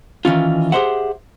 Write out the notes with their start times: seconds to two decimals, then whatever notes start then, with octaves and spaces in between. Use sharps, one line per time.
0.25 D#3 E3 C#4 F4
0.72 G4 G#4 C5 E5 F#5